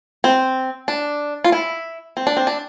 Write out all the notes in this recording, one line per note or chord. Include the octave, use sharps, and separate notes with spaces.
C4
D4
F4
E4
C4
D4
C4
D4